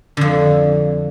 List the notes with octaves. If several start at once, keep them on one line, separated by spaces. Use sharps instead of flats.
F2 D3